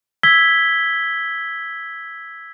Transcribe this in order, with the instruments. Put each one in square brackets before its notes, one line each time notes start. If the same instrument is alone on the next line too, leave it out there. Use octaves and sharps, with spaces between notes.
[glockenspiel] E6 G#6 B6 G7